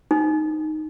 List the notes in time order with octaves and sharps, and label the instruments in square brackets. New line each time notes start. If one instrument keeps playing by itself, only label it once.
[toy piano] D#4